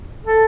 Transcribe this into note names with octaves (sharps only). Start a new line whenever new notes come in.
A4